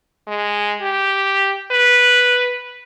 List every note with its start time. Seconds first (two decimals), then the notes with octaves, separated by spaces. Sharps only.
0.27 G#3
0.81 G4
1.71 B4